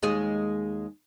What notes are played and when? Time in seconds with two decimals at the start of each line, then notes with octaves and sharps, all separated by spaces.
0.02 D#2 G#3 G#4